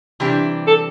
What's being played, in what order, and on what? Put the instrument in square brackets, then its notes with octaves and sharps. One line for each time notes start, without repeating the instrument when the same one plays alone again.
[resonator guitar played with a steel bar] C3 E3 G3 D4 G4
[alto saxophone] A4